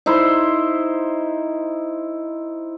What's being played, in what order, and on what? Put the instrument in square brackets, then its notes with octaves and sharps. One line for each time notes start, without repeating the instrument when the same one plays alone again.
[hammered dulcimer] D#4 E4 C5